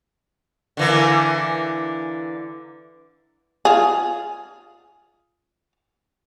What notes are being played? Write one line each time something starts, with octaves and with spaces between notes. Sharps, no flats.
D3 E3 A#3
F4 G#4